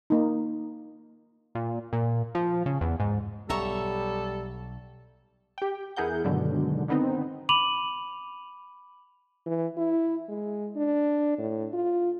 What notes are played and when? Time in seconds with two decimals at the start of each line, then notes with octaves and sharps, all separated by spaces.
0.10 A#3 D#4
1.55 A#2
1.93 A#2
2.35 F3
2.66 C#3
2.81 E2
3.00 G#2
3.49 B1 G3 A4 C#5 E5 A#5
5.58 G4 G5
5.96 E2 E4 G#4 A#4 F#5 G6
6.24 G2 B2 D3 D#3 F#3 G#3
6.88 D3 D#3 B3 C4 D#4
7.49 B5 D6 D#7 F7 F#7
9.46 E3
9.77 E4
10.29 G#3
10.76 D4
11.38 A2
11.73 F4